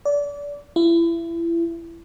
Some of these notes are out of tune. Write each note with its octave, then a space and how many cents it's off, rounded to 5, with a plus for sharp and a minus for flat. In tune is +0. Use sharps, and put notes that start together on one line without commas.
D5 -25
E4 +30